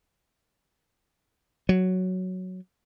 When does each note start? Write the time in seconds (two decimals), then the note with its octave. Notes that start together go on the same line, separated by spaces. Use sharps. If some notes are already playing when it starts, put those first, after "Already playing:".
1.69 F#3